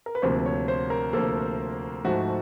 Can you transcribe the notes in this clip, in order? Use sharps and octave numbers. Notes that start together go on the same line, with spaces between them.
A#4
B4
D2 C3 F3 A#3 C5
C#5
C5
A#4
D2 C3 F3 A#3 A4
G#2 F3 A3 F#4